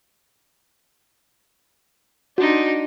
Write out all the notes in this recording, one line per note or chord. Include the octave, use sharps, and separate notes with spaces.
D4 D#4 F#4